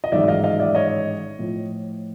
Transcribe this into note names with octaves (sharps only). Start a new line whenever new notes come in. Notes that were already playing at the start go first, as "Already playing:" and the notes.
D#5
A1 G#2 D#3 F#3 D5 E5
D#5 F5
D#5 F5
D5 E5
C#5 D#5
A2 F3